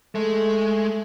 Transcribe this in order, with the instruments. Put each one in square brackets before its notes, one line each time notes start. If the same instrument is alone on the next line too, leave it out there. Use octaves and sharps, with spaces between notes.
[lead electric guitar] G#3 [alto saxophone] A3